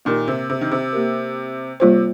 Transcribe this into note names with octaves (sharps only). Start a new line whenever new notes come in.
A#2 D#3 A#3 G4 A#4
C3
C3
D#3
C3
A#3 G4 A#4
C3 G3 A#3 F4 C5